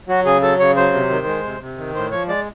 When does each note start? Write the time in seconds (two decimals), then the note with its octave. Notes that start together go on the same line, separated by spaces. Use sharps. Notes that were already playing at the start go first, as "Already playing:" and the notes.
0.08 F#3 F#4
0.25 C#3 G#4
0.42 F#3 A4
0.59 C#3 C#5
0.76 F#3 C5
0.93 C3
1.10 D#3
1.27 G#3
1.44 C3
1.60 C3
1.78 D#3
1.95 A2 C5
2.11 F3 C#5
2.28 G#3 D5